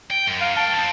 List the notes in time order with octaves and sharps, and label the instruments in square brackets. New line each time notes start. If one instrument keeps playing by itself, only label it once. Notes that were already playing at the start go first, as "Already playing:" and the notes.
[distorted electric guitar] G5
F#2
[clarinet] F5
[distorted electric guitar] G#2 G5 [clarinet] A5
[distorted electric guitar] F3 C4